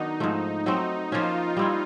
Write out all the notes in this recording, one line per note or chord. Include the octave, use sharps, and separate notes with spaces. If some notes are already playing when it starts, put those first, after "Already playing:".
Already playing: D#3 F#3 B3 D4 D#4
G#2 F3 A3
F#3 A3 C4 D#4
F3 A#3 C#4 F4
G3 C4 E4